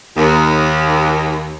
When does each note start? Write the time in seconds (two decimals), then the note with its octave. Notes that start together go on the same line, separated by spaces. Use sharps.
0.17 D#2